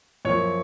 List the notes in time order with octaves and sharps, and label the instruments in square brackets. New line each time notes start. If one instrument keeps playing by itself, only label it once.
[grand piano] F#2 F3 A#3 C#5